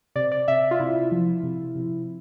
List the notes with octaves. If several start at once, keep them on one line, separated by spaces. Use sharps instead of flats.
C3 D5
D5
C3 E5
F4
C3 E4
F3
C3
C3